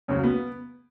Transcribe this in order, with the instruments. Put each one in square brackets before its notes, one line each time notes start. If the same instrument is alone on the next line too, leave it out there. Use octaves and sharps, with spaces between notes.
[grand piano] C#2 C#3 F#3 [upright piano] C#4
[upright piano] B3